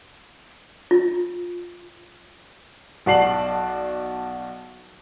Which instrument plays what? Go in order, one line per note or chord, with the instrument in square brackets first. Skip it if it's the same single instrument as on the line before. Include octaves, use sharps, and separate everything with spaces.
[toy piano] F4
[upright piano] B1 F#4 D5 A5 C7 F#7